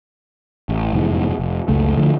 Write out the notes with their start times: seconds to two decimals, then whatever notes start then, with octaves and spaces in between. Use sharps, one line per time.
0.69 A1
0.93 F1 E2 G#2
1.39 F1
1.68 F#1 C#2 A3
1.97 D3 F3 A3